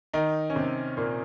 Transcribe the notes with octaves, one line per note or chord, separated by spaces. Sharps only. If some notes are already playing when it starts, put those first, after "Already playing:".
D#3 D#4
C#4
C3 C4
A#2 A#3